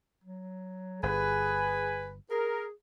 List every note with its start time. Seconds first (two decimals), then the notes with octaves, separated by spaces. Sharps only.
0.24 F#3
1.03 G1 G#4 B4 G#5
2.31 G#4 A#4